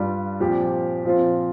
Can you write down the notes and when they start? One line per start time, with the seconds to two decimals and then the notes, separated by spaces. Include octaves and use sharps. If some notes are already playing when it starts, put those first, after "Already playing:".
Already playing: G2 G3 D4 F4
0.40 A#2 F3 C4 G4
1.05 A#2 F3 C4 F4